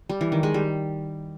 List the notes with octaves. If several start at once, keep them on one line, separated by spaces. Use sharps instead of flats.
G3
E3
D#3
G#3
G3